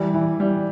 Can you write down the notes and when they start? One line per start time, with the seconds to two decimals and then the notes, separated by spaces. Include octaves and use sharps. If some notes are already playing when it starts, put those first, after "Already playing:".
Already playing: E3 G3
0.14 E3
0.40 G3